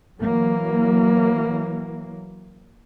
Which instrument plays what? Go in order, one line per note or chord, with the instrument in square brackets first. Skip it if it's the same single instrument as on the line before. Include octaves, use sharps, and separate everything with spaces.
[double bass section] E3 F#3 A#3